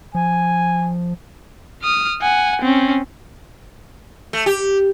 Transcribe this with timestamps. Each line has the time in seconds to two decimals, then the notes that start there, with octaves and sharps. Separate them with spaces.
0.15 F3 G#5
1.83 D#6 F6
2.22 F#5 G#5
2.62 C4 C#4
4.33 A3
4.46 G4